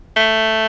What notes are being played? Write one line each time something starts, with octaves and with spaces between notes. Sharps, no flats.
A3